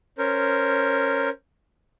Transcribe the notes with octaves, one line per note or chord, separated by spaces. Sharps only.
C#4 A#4 C5